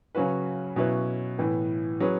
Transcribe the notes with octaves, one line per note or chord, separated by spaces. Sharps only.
C#3 F#3 C#4 F#4 B4
B2 F#3 C#4 E4 B4
A2 E3 B3
F#3 C#4 G#4 B4